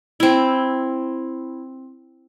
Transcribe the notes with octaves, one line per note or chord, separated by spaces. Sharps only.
C4 E4